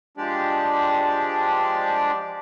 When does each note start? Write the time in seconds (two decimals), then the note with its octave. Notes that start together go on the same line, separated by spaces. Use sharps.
0.17 F3 G#3 D4 G4 D5